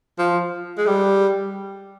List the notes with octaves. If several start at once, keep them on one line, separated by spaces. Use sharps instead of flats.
F3
G#3
G3